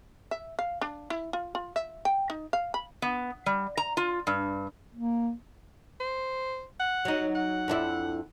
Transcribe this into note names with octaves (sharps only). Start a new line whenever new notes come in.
E5
F5
D4
E4
F4
F4
E5
G5
D#4
F5
B5
B3
G3
A#5
F4
G2
A#3
C5
F#5
F#3 D#4
F#5
F2 D4 E4